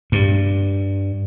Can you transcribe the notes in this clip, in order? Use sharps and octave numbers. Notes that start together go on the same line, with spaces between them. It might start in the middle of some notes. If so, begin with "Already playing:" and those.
G2